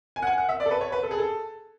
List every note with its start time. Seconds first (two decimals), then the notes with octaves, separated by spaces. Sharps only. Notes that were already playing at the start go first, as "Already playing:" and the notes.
0.16 G#5
0.22 F#5
0.27 G#5
0.38 F#5
0.49 E5
0.60 D5
0.66 A4
0.71 B4
0.81 C#5
0.92 B4
1.03 A4
1.11 G#4
1.19 A4